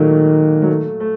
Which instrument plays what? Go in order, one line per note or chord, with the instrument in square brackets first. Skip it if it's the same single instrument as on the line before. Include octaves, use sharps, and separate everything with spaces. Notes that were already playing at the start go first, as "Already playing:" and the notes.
Already playing: [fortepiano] A#2 F#3 A3 A#3 [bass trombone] D#3
[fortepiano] F#3
A3
A3